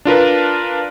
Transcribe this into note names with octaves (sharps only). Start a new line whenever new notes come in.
D4 F4 A#4 B4